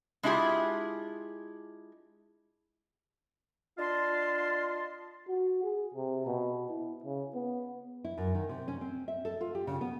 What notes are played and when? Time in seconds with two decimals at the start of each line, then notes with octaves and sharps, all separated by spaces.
0.23 G#3 D4 E4 F4 G4 G#4
3.78 D4 F4 D#5 F5 A5 C6
5.28 F#4
5.63 G#4
5.94 C3
6.26 B2
6.69 E4
7.04 C#3
7.34 B3
8.04 E4
8.18 F#2
8.35 D#3
8.49 C3
8.68 C#4
8.81 C4
9.08 E5
9.25 A4
9.41 F4
9.55 G4
9.67 C#3
9.81 B3